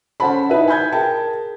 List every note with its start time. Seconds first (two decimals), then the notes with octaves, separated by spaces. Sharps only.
0.20 C#4 A4 C5 F#5 A5 B5
0.50 D#4 E4 B4 E5
0.68 G#5 B5 G6 G#6
0.92 G#4 A#4 G5 A5